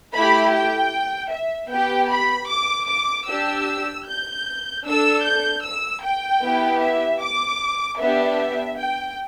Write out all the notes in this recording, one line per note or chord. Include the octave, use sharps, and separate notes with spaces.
A3 E4 G4 B5
G5
E5
B3 G4 G5
B5
D6
D6
D4 G4 E6
G6
D4 A4 E6
G6
E6
G5
B3 E4 G4
E5
D6
B3 D4 G4 E5
G5